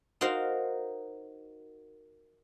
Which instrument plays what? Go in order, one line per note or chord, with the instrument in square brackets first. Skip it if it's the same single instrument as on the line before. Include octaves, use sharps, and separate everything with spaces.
[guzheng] D#4 F#4 A#4 C5 F5